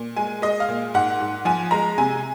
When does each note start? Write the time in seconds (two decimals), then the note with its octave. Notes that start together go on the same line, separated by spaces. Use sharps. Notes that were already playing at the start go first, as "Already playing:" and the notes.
Already playing: A#2
0.16 G#3 G#5
0.42 G#3 D#5
0.60 F5
0.69 A#2
0.94 G#2 F#5
1.20 G#2
1.45 F3 G#5
1.71 G#3 A#5
1.98 C3 G#5